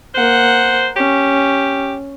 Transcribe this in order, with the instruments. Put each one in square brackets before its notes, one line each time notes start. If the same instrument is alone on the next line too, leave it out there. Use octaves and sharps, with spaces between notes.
[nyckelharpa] A#3 F#5 [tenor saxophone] C5
[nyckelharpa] C#4 [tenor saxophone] G4